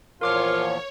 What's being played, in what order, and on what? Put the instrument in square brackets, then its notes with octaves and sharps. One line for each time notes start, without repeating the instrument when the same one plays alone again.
[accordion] E2 A#2 F3 [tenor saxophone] F4 [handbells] A#4 D6 F6 [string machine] C#5